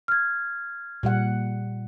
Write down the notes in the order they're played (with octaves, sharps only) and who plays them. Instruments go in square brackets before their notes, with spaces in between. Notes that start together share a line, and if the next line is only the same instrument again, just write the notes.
[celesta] F6 G#6
[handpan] A#2 G3 F#5